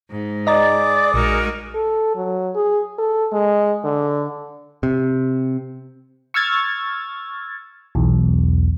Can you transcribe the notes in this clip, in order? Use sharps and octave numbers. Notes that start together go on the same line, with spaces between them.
G#2
G#4 D5 D#5 A#5 D6 A6
A#1 G#3 D#4 F#4 A#4
A4
F#3
G#4
A4
G#3
D3
C3
C#6 E6 F6 G#6 A6
B1 E2